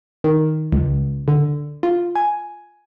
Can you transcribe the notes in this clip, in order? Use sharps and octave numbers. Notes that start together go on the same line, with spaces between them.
D#3
C#2
D3
F4
G#5